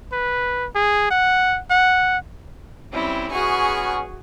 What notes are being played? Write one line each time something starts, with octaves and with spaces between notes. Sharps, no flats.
B4
G#4
F#5
F#5
G3 C4 C#4 E4
G#3 B3 C#4 F#4 G#4 G#5 C#6